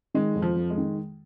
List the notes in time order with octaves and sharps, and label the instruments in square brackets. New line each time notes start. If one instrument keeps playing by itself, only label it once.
[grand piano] D#3 [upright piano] G#3
[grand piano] F2
[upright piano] F3
[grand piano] F2
[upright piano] G#3
[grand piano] D#3